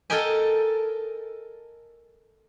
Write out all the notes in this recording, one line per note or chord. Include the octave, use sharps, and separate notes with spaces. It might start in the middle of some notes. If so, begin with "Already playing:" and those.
A4 A#4 D#5 G5 G#5